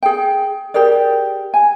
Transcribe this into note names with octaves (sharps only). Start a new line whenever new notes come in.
G#4 G5
G4 G#4 A#4 D5
G#5